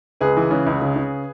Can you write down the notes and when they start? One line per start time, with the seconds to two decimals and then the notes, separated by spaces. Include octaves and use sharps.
0.21 C#2 G#4 B4
0.37 E3
0.51 C#3
0.66 C#2
0.82 C#3
0.96 C#3